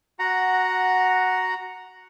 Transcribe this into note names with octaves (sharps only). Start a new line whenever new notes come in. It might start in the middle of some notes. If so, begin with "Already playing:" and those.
F#4 F#5 A#5